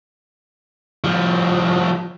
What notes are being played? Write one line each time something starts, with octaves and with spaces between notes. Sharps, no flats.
F3 G3